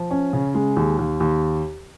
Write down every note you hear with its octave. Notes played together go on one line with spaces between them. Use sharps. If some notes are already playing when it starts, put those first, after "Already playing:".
Already playing: F3
C#4
C#3
G#3
D#2
D#2
D#2